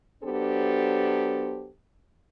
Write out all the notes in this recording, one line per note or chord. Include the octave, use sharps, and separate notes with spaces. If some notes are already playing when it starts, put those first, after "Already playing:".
F#3 B3 D4 G4 A4 C5